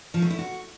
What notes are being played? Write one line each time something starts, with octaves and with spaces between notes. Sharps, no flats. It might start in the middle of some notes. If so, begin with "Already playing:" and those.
F3
A3
E4
F#4